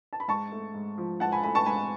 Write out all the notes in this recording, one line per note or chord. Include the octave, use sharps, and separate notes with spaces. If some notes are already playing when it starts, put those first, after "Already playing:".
A5
B5
G#2 A5 C#6
A3
G#2
F3
G#2 F#5 A5
G#5 B5
A3 G#5 B5
A5 C#6
G#2 G#5 B5